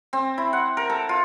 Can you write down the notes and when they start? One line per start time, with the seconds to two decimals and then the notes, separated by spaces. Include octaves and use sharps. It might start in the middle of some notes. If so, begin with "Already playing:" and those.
0.13 C4
0.38 E4
0.53 F#5
0.77 A#4
0.90 A4
1.09 F4